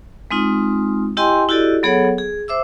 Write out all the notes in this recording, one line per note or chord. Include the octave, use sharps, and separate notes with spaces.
G#3 C4 D#4 F4
E4 G4 D#5 G5 G#5 C6
E4 F#4 G4 A4 D5 D#5
F#3 B3 G#4 A4 C#5 F#5
G#4
C5 E5 D6 E6